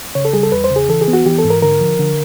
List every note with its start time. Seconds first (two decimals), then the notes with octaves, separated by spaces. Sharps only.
0.15 C#3 C#5
0.25 A4
0.33 G3 G#4
0.43 A4
0.52 E2 B4
0.64 C5
0.71 C#3
0.76 G#4
0.89 E3 A4
1.01 G#4
1.08 B3
1.13 F#4
1.26 E3 G4
1.39 A4
1.44 G#2
1.50 A#4
1.62 D3 A#4
1.81 F3
1.99 D3